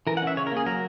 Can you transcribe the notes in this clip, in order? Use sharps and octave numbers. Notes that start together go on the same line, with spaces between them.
E3 A#4
F#5
C#4 E5
C#3 C#5
A#4
A#3 G#4
F#3 A#4